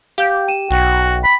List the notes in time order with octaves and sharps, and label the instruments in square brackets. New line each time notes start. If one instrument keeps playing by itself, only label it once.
[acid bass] G4 [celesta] F5 G6
[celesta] G5 D#7 E7
[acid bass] B1 [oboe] F#4 [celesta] G5
[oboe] B5